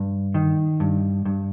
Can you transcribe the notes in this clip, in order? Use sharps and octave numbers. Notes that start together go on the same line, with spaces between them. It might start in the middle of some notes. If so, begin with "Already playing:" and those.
Already playing: G2
D#3
G2
G2